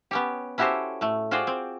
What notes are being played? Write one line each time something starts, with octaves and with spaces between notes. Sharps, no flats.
B3 C#4 G4
C#4 E4 F#4 G4 A4 C5
A2 A3
F4 F#4 G#4 C5 D5 G5
C4